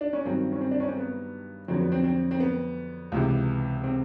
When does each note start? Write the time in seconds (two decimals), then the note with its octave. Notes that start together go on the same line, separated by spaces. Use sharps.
0.01 D4
0.13 C#4
0.25 G2 D#3 F#3 C4
0.52 C#4
0.61 C4
0.71 D4
0.80 C#4
0.89 C4
0.97 B3
1.68 F2 D3 F#3 C4
1.80 B3
1.92 C4
2.04 C4
2.31 C4
2.40 B3
3.12 C#2 C3 E3
3.84 C4